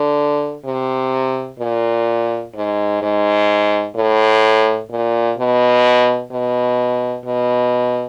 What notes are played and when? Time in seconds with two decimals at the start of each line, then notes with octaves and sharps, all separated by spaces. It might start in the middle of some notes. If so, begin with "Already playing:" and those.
Already playing: D3
0.65 C3
1.59 A#2
2.55 G#2
3.02 G#2
3.95 A2
4.90 A#2
5.38 B2
6.31 B2
7.25 B2